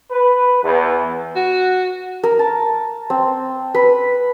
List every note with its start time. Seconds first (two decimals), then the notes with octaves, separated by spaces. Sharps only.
0.11 B4
0.63 E2
1.36 F#4
2.23 A#4
2.39 A5
3.10 C4
3.74 B4